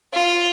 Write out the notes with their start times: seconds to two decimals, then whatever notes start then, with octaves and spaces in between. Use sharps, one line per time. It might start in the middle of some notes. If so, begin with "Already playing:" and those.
0.13 F4